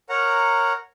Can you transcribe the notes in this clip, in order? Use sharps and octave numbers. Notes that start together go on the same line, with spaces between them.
A#4 C#5 F#5 A#5